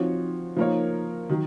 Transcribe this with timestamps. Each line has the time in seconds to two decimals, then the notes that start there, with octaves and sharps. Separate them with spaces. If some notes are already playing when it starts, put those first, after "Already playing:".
Already playing: F3 C4 D#4 F#4 C#5
0.57 F3 A#3 D#4 A#4 C#5
1.29 D#3 F#3